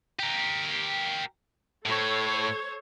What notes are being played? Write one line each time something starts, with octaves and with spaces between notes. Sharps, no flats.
G4 A#4
A2 A4 C5 C#5